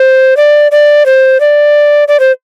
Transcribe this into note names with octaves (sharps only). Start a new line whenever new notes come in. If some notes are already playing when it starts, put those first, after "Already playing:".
Already playing: C5
D5
D5
C5
D5
D5
C5